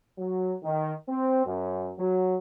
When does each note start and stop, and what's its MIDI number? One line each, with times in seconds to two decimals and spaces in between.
0.18 0.53 54
0.63 0.92 51
1.09 1.44 60
1.45 1.92 42
1.98 2.37 54